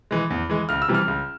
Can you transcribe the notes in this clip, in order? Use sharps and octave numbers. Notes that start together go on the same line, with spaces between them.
E3 G#3
E2
E3 G#3
C#2 F6
E6
C3 E3 G3
F6
C#2